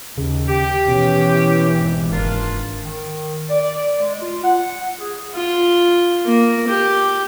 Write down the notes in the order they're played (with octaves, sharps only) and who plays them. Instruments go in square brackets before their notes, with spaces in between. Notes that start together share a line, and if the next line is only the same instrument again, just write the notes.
[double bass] D#2 [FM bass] C#3
[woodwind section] G4
[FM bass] B2 [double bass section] E3 [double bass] C#4
[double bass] G#1
[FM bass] F#1 [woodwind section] A#3 D4 F4
[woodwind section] D#3
D5
G#3
F4
F#5
G#4
[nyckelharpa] F4
A#3
G4